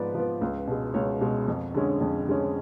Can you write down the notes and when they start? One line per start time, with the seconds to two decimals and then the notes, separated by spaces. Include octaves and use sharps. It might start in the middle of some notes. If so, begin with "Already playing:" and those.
Already playing: G#2 F3 B3 B4 D5
0.15 F3 B3
0.41 C#2
0.67 B2 G#3
0.94 C#2 C#5
1.21 B2 G#3
1.48 F2
1.74 D3 G#3 C#4
2.01 F2
2.27 D3 G#3 C#4